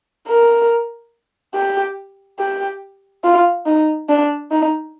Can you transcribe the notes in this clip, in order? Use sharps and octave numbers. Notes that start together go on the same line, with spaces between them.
A#4
G4
G4
F4
D#4
D4
D#4